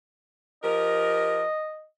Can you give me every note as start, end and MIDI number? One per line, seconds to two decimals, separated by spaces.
0.64 1.44 53
0.64 1.44 67
0.64 1.44 70
0.64 1.84 75